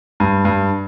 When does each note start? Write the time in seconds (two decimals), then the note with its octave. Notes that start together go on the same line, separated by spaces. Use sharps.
0.20 G2
0.45 G2